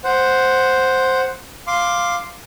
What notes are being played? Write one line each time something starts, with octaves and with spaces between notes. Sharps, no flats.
C5 F#5
F5 C6 D6